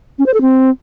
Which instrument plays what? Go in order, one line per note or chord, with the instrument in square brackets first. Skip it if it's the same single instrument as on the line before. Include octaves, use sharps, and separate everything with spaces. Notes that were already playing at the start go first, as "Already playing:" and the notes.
[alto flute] C#4
C5
A4
C4